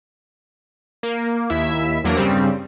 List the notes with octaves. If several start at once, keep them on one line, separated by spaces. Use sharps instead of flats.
A#3
D#2 E4 E5
E2 F#3 A#3 D4 A#4 A#6
G2 C#3 G3 C4